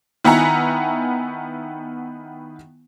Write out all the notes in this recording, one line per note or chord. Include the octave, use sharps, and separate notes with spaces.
D#3 B3 E4 F#5 G#5 A#5